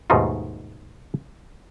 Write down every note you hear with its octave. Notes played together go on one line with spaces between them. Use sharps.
D#2 G#2 B2 A3 D#4 F4